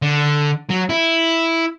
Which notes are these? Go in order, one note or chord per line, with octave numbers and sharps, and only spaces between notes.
D3
F#3
E4